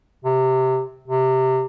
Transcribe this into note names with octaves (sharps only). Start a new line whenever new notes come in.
C3
C3